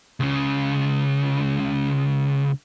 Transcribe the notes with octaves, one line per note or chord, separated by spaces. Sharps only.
C#2 C#3